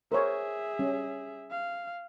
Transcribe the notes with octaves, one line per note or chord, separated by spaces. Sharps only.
G#4 A#4 C5 C#5 E5
G3 C#4
F5